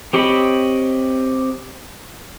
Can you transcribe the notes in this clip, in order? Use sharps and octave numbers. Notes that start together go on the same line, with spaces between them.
C4 G4 C#5 D#5 B5